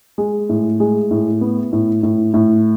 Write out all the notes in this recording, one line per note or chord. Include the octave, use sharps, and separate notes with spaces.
G#3
A2
G#3
A2
B3
A2
A2
A2